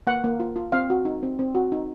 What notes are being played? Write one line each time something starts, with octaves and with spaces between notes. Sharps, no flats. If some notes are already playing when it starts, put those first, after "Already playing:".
A#3 F#5
A#3
F4
F4
C4 F5
F#4
D#4
C4
C4
F#4
D#4